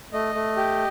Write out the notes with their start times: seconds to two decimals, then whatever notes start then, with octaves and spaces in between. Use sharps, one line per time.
0.13 A3 D#5
0.35 A3
0.57 G4